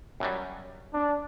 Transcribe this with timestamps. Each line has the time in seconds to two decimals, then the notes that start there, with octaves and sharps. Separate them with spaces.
0.20 F#2 F#3 G3
0.94 D4